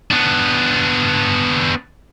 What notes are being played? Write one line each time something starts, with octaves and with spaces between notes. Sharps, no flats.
B3 D4